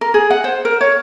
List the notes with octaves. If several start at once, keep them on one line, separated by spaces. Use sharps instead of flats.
A#4
G#4
F#5
C5
A#4
C#5